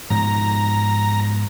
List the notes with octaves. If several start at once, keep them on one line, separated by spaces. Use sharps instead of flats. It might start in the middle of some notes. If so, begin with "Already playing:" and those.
G#2 B2 F3 A#5